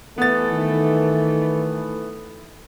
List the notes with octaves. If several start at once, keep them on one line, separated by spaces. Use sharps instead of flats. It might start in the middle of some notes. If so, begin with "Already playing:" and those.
E3 A3 B3 A6
D#3